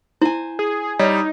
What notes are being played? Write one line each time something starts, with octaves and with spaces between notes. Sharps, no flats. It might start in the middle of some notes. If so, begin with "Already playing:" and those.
E4 C5 G#5
G#4
G3 D#4 C#5